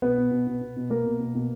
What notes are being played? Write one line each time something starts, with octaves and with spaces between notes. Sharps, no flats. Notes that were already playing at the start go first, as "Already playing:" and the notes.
B2 B3 B4
B2
B2
B2
B2
B2
B2 A#3 A#4
B2
B2
B2